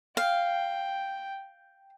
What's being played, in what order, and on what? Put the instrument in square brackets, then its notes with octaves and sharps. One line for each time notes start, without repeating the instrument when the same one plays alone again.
[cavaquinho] F5 [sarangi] G5